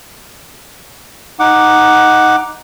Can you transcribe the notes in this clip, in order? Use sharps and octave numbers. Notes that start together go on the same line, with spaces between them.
D#4 F#5 D6